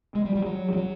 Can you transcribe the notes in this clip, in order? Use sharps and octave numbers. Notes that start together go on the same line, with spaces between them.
G#3
G3
G3
F#3
G3
F#3